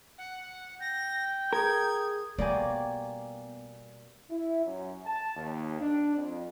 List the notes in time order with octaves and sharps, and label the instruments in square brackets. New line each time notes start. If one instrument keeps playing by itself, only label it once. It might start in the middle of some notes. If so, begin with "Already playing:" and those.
[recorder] F#5
[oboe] G5 [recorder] A#6
[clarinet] G#4 [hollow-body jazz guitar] A#4 [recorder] G#6
[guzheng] B2 G3 A#3 [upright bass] B3 [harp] D5 G#5
[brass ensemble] E4
F#2
A5
D#2
D4
F2